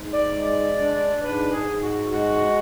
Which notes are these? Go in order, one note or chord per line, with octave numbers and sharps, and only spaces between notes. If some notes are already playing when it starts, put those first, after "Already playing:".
Already playing: G#2
D5
G#3
D4
G#2 B4
G#4
G#2
F#4
G#3 F#4